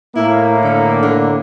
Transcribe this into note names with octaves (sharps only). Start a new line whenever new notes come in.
A2 A#3 E4
D3
D3